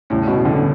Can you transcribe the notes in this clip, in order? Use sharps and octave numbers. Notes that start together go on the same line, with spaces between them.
E2 A2 C#3 G3 C#4
B2
D3